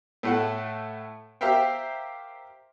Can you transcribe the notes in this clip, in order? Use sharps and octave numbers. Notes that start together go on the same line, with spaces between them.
A2 A3 F#5
G4 A#4 C5 E5 F5 G5